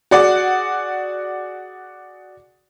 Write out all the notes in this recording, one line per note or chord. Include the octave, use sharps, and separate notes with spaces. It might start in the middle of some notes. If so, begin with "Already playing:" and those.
F#4 G#4 D5 F#5